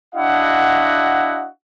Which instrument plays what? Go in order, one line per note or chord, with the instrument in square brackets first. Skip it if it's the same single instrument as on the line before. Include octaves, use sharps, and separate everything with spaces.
[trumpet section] D4 E4 F#4 D#5 F5 F#5